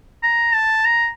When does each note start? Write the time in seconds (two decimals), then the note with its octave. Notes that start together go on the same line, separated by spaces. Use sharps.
0.23 A#5
0.55 A5
0.86 A#5